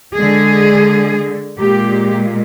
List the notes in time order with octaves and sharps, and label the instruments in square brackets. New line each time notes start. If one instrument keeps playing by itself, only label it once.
[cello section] D3 G#3 G#4
A#2 G#3 G4